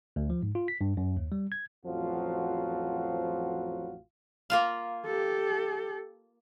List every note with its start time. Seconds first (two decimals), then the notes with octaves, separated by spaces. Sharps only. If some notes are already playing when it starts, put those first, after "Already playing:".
0.16 D2
0.30 F3
0.43 G#2
0.55 F4
0.68 B6
0.81 G2
0.97 F#2
1.17 D#2
1.32 G3
1.52 G#6
1.86 A1 F2 F3 F#3 F4 F#4
4.50 A#3 F4 F5
5.06 G4 A4